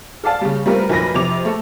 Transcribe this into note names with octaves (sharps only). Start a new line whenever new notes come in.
A4 D5 F5 A5
C#3 G3
G3 A3 C4 F4 A#4 B4
F1 A#2 F#3 B4 B5 A#6
F2 C3 D6 F7
A3 A4